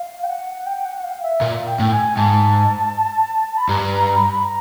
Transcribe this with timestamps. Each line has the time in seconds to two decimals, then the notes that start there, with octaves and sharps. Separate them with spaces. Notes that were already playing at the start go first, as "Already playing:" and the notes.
Already playing: F5
0.24 G5
0.28 F#5
0.66 G5
0.85 F#5
0.98 F#5
1.04 F5
1.23 E5
1.41 A#2 F5
1.67 G5
1.80 A2
1.92 G#5
2.17 G#2 A5
3.57 B5
3.69 G2 A#5
4.15 B5
4.24 A#5
4.32 B5
4.45 A#5